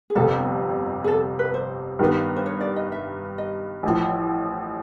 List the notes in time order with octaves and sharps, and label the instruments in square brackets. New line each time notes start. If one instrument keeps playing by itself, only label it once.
[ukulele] G#4
[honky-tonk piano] G1 F2 C3 [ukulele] A4
[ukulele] G#4
A4
B4
C5
[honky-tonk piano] G2 D#3 G3 B3
[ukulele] C5
C#5
D5
D#5
E5
D#5
[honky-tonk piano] A1 A2 F3